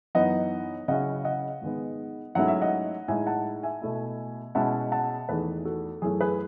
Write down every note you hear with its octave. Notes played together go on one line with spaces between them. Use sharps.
F#2 E3 B3 D#4 D#5 F#5
C#3 F#3 C#4 E4 D#5 F#5
D#5 F#5
G#2 D#3 G#3 B3
G#2 F#3 A3 C#4 E4 F#5
E5
D#5 F#5
A2 G#3 D#4 E5 G#5
F#5 A5
E5 G#5
B2 A3 E4
B2 G#3 C#4 E4 F#5 A5
F#5 A5
E2 D#3 A3 G#4 B4
F#4 A4
F#2 E3 A3 G#4
G#4 B4